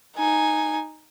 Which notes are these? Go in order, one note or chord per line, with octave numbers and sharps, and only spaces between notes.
D#4 G#5